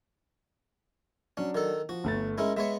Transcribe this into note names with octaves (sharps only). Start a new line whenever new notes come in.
F#3 C#4 D4
D#3 A4
F3 F#4
G1 A3 A6
G#3 C#4 E4 A#4
G#3 B3 C#5 E5